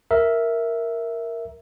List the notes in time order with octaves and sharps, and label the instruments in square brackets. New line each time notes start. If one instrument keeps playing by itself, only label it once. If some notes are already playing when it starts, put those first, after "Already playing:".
[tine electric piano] A#4 E5